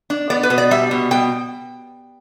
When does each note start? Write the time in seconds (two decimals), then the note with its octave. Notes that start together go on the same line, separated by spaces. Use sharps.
0.10 D4
0.30 B3 D5
0.43 B4
0.50 B2
0.58 D5
0.71 G3 E5
0.91 B2
1.11 B2 G5